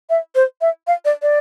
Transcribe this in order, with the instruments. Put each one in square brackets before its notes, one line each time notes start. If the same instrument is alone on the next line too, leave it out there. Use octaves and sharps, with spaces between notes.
[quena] E5
C5
E5
F5
D5
D5